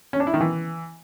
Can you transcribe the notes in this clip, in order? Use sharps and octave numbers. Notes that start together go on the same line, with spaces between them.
C#4
D4
E4
D#3
E3